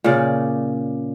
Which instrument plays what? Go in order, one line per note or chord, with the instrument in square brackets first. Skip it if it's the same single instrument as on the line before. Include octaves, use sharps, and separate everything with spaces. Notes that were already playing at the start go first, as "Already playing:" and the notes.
[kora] A#2 C#3 D5